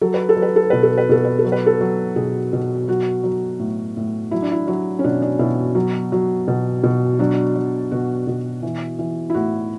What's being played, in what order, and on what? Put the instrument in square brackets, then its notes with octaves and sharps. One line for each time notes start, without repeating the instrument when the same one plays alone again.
[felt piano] F#3 A4
B4
A4
F#3
B4
A4
B2 B4
A4
B4
B2 A4
B4
A4
F#3
B4
A4
F#3
B2 G#4
B2
F#3 F#4
F#3
A2
A2
F#3 E4
D4
E4
F#3
C#4
B2 D4
D4
B2 E4
F#3
F#3
B2
B2
F#3 D4
F#3
B2 F#4
B2
E3
E3
E4
A2 F#4